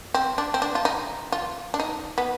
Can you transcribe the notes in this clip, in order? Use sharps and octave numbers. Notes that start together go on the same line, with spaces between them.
C4
D4
C4
D4
F4
D#4
F4
D4
D#4
B3